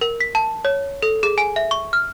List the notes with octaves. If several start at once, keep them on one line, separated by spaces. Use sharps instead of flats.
A#4
B6
A5
C#5
A4
G#4
G#5
E5
C#6
F6